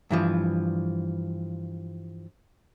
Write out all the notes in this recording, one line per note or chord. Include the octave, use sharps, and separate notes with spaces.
G2 E3 F3